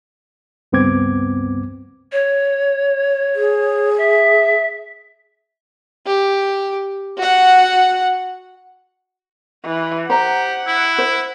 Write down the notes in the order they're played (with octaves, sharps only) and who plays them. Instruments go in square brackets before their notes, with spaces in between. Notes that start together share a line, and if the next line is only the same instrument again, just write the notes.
[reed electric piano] C#2 G2 B3 C4 D6 G#6
[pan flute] C#5
[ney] G#4
[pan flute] E5
[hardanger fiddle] G4
F#4 F#5
[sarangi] E3
[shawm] G4 [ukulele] C5 A#5 [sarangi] F#5
[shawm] E4
[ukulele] C5